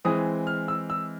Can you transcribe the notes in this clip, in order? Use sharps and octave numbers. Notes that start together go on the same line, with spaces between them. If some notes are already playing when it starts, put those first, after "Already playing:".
E3 G#3 C4 D#6
F6
E6
E6